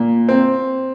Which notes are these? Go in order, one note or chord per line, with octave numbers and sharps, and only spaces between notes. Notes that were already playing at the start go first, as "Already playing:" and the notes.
Already playing: A#2
C4